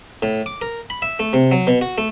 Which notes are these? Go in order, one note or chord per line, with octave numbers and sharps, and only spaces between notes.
A2
D6
A#4
B5
E5
A3
C3
F#3
B2
F#4
A3